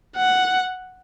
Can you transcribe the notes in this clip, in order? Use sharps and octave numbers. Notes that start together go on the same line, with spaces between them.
F#5